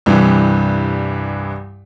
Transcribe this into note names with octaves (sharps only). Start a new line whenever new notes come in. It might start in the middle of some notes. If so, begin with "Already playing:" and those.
C2 G2 E3